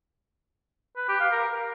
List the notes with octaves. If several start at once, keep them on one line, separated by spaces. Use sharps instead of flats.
B4
G4
F5
A#4